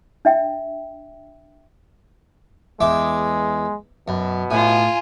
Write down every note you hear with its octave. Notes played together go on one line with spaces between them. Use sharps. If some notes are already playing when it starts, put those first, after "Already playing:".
D4 E5 G5
E2 G#3 E5 D6
F#2 B2
A2 F4 G#5